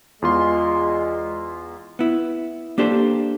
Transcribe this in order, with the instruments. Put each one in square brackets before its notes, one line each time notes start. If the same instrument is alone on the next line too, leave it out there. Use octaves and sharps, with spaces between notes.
[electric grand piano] E2 F4 C6 [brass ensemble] G#3
[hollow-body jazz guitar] B3 E4
A#3 D4 G4 A4 C5